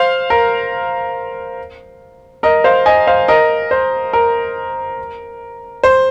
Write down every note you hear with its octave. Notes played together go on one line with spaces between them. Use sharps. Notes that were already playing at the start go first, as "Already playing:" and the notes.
Already playing: C5 F5
A#4
A#4 D#5
C5 F5
D#5 G#5
C5 F5
A#4 D#5
C5
A#4
C5